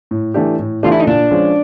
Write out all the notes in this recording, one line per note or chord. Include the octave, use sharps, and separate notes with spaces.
A2
E3 A3 D4 G4
A2
E3 A3 D4 F4 G4
E4
D#4
A#2 D4
F3 G#3 C#4